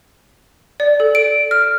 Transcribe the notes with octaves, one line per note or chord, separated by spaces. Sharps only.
D5
A4
D7
F6